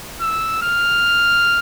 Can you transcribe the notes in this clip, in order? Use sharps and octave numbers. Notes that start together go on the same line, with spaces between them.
E6
F6